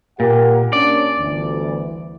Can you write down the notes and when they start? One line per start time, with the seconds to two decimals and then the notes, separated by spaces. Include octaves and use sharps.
0.20 A#2 G4 A#4 F#5
0.73 C#4 D4 D5
1.19 G1 D2 E3